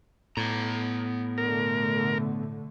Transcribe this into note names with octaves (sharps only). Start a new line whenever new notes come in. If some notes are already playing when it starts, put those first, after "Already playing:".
A2 B3 A#5
B2 D3 A3 A#4